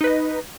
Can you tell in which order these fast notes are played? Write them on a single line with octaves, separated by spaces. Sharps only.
D#4 B4 D#5